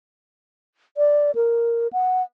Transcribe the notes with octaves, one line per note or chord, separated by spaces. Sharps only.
D5
A#4
F#5